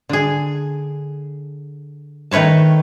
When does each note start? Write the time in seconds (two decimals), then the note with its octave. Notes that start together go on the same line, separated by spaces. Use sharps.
0.09 D3 G#4
2.31 D#3 A3 B4 C#5 A5